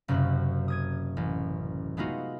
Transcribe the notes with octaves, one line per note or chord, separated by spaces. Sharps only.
F#1 F#2 C3 F#6
D#6 G#6 D#7
A1
G#3 A3 B3 D#4 F4 F#4